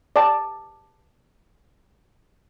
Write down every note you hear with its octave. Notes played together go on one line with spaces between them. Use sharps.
D5 A5